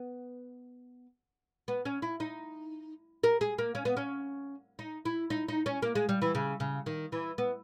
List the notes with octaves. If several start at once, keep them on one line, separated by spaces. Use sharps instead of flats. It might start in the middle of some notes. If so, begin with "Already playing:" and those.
Already playing: B3
B3
C#4
E4
D#4
A#4
G#4
A#3
C#4
B3
C#4
D#4
E4
D#4
D#4
C#4
A#3
G#3
G3
E3
C#3
C#3
D#3
E3
B3